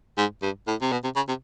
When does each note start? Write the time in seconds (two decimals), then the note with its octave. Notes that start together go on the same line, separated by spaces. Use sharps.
0.18 G#2
0.42 G2
0.67 A2
0.81 C3
0.92 B2
1.04 C3
1.16 C#3
1.28 C3